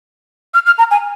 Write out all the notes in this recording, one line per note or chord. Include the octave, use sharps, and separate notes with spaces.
F6
F6
A#5
G#5